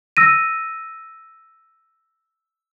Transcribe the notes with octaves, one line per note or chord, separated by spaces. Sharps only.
E6 A#6 D#7